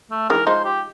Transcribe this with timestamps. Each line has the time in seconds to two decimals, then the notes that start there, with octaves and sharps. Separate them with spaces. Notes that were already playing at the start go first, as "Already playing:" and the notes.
0.11 A3
0.30 D#3 E3 G#3 A#4
0.47 F3 G#3 D#4 C5
0.65 G4